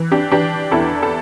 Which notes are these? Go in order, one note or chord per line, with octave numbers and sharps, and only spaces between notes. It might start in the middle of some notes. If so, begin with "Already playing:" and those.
Already playing: E3
D4 G4
E3 D4 G4
E2 E4 A4
A4